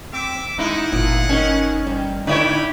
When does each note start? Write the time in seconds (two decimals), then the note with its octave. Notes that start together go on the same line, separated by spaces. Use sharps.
0.13 C4 E5 D6
0.58 G#3 A3 D#4 E4 G#4 F#5
0.92 G1 A#2 F4
1.29 D#3 C#4 D#4
1.87 G2 D#3 D#4
2.27 D3 B3 D#4 E4 G4 C#5 D5 B5